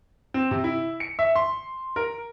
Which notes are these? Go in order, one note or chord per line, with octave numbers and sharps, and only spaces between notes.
C4
C3
E4
C#7
E5
C6
A#4